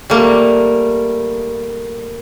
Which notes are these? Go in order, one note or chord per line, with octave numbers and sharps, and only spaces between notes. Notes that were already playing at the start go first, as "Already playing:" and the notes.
G3 A3 A#3